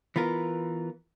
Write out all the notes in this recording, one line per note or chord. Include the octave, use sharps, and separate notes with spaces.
E3 B3 F4 A#4